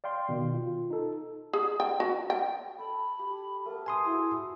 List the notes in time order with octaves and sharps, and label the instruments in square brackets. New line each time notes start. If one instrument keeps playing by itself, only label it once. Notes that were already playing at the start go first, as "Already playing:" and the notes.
[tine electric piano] D5 F5 G5 C6
B2 D#3
F4
D#4 A4
[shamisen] G#4
G5
F#4
G5
[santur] A4 [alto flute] B5
[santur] G4
[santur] A3 B3 [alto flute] A#4
[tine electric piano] G#5 C6 D#6
[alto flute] E4 [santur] F#4 G#4 C5